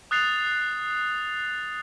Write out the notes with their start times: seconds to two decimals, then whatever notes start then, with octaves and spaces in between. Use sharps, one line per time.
0.11 D#6 F#6 A6 C7 F7